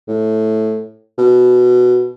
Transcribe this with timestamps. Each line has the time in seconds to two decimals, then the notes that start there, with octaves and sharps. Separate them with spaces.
0.08 A2
1.18 B2